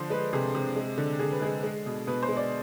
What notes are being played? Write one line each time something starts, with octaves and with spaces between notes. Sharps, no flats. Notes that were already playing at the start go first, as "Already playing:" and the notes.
Already playing: D3 F3 C5
G#3 B4
C3 G#4
C3
G#3
D3
D3 G#4
B4
G#3 G#4
G#3
B2
B2 B4
C5
G#3
D5